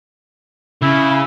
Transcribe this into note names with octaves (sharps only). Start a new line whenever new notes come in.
C#3 E4